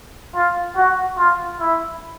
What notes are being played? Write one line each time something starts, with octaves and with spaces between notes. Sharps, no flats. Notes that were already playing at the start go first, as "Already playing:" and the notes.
F4
F#4
F4
E4